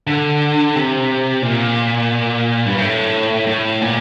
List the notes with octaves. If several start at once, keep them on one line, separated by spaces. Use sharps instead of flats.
D3
C3
A#2
G2
A2
A2
A#2